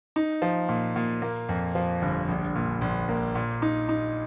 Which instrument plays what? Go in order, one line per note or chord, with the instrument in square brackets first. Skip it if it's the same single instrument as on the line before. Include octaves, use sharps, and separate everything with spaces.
[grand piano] D#4
F3
A#2
A#2
A#3
F2
F3
G1
A#1
A#2
A#1
A#3
A#2
D#4
D#4